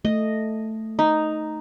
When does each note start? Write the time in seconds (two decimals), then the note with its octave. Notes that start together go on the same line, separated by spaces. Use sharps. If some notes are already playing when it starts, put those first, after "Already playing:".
0.05 A3 D#5
0.99 D#4